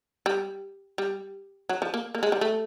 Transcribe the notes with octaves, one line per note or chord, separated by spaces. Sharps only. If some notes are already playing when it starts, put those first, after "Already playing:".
G3
G3
F#3
F3
A#3
A#3
G#3
G3
A3